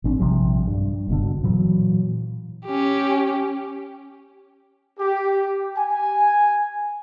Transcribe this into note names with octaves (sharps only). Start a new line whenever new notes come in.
A1 A#2 C4 D4
A#1 C3 F3 G3
G2
F#1 B2 D3
A#2 E3 F#3
C#4 G4
G4
G#5